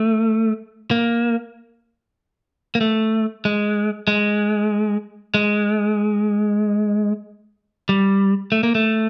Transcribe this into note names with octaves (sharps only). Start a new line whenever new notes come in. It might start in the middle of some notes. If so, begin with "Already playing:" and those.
Already playing: A3
A#3
A#3
A3
G#3
G#3
G#3
G3
A3
A#3
A3